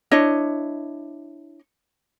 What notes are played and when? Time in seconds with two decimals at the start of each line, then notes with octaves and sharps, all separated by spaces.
0.11 D4 E4 C#5 D#5